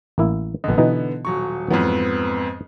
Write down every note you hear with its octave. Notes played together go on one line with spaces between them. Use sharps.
A1 A#3 E4
A#1 D3 B3 D#5
B2 E3 D#4
D#1 F#3 C#6
F2 G#2 E3 F#3 B3